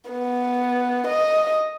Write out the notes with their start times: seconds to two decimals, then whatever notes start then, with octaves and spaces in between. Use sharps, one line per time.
0.10 B3
1.07 D#5